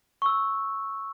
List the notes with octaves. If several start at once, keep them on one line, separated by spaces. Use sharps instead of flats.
C#6 E6